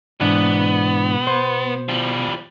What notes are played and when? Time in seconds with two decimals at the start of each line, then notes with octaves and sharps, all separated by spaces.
0.21 G#2 B2 E3 B3 D4
1.27 C5
1.89 F3 G3